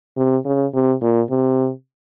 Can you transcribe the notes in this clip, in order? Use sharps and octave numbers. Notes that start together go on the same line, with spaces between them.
C3
C#3
C3
A#2
C3